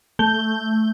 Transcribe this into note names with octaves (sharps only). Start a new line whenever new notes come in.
A3 G6 G7